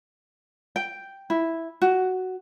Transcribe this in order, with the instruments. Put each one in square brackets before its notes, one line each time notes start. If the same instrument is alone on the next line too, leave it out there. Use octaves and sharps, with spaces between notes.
[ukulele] G5
E4
F#4